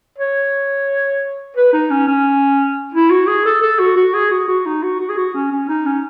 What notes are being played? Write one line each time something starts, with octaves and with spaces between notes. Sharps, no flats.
C#5
B4
D#4
C#4
C#4
E4
F#4
G#4
A4
A4
F#4
F#4
G#4
F#4
F#4
D#4
F#4
F#4
G#4
F#4
C#4
C#4
D#4
C#4